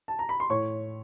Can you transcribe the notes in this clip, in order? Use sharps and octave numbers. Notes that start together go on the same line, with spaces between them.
A5
A#5
B5
C6
A2 C#5 C#6